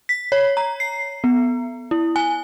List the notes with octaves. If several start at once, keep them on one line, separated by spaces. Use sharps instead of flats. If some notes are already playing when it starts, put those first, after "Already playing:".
B6
C#5
A#5
C7
B3
E4
G#5